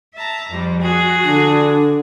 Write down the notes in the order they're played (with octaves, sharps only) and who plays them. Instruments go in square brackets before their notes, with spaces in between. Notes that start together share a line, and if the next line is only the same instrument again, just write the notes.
[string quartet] E5 A5 A#5
F2 G3
F#4 G#4
[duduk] D3 [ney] D4